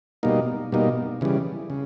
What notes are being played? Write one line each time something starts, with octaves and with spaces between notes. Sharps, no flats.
B2 G3 A#3 D#4
B2 G3 A#3 D#4
C#3 E3 G3
C#3